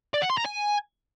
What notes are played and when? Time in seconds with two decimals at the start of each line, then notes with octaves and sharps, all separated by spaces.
0.14 D5
0.22 F#5
0.30 C6
0.38 A#5
0.45 G#5